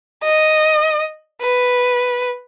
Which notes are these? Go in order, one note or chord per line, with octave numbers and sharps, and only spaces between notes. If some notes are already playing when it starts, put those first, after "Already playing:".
D#5
B4